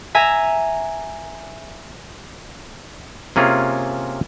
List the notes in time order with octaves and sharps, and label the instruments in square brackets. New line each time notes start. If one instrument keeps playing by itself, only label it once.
[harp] E5 G#5 A#5
[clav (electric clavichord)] C3 A#3 C#4 F4 G#4